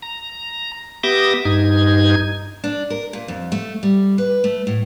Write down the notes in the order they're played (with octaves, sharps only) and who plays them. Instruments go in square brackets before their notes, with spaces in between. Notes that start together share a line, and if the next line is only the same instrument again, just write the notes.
[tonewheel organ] A#5
B3 G4 E5 D6 D#6 A#6
G2 D#4 G#6
[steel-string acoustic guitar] D4
A#4
A#2
F2
A3
G3
B4
A3
A2